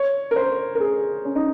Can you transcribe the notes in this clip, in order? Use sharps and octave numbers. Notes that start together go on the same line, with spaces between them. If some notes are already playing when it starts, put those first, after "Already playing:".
Already playing: C#5
A#4
C5
A#4
G#4
C#4
D#4